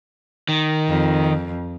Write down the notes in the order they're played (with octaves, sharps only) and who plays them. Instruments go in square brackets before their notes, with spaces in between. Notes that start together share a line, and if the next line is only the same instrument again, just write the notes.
[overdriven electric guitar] D#3
[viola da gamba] F2